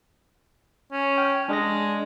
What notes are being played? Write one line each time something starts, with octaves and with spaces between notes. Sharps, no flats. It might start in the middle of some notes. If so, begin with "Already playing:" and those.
C#4
G5 F6
G#3 D4 G#4 A#6